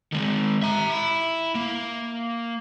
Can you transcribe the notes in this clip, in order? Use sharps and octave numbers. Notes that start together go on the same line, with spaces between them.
D#3 G#3
E5 A#5
E4
A#3